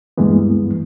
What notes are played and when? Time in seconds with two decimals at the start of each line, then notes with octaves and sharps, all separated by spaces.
0.18 D2 G2 E3 G#3 A#3 B3